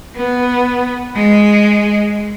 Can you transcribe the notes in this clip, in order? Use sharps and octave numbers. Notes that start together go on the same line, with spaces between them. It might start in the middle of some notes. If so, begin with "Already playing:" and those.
B3
G#3